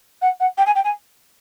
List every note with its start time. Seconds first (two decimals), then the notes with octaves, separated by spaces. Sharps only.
0.22 F#5
0.40 F#5
0.57 G5
0.66 G#5
0.75 G5
0.84 G#5